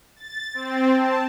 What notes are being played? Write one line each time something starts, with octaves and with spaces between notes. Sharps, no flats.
A6
C4
A5